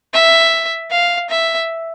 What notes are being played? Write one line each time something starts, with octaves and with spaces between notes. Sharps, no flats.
E5
F5
E5